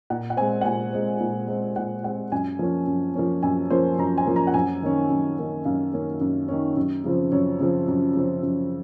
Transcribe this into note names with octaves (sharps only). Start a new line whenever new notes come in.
A#2 F#5
F#5
G#3 C4 G#5
F#5
A#2 G#5
G#3 C4
A#2
G#3 C4
A#2 F#5
G#3 C4 F#5
F#2 G#5
F3 A#3 C#4
F#2
F3 A#3 C#4
F#2 G#5
F3 A#3 C#4 C5
F#2 A#5
G#5
F3 A#3 C#4
A#5
F#5
F#2 G#5
D#3 A#3 C#4
F#2
D#3 A#3 C#4
F#2 F5
D#3 A#3 C#4
F#2
D#3 A#3 C#4
F#2
C#3 F3 C4
F#2 C#5
C#3 F3 C4
F#2
C#3 F3 C4
F#2